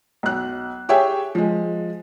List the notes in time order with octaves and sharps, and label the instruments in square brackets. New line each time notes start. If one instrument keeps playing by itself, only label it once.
[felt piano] B1 F#6
G4 G#4 C#5 E5 G5
F3 G#3